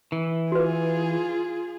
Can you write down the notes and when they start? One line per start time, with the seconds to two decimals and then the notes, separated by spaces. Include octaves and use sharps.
0.12 E3
0.52 F4 F#4 G#4 B4